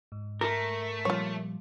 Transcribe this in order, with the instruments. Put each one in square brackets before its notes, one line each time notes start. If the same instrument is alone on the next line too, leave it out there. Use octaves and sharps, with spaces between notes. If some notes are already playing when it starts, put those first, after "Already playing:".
[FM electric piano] G#2
[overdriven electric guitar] A3 [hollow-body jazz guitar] A#4
[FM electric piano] A#2 F3 G3 [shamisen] F4 C#5